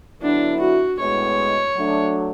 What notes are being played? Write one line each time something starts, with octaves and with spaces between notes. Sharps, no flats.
D3 F#3 B3 D4 E4
F#4
A2 G#3 B3 C#5
F#3 A3 D4